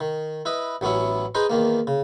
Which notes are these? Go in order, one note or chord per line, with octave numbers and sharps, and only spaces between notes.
D#3
E4 B4 D#5
A1 F#3 B3 C#4 E4
D#4 G#4 B4 C5 D#5
E2 D#3 A#3
C#3